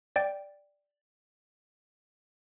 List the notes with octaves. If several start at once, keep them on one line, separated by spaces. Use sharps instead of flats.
D5 G5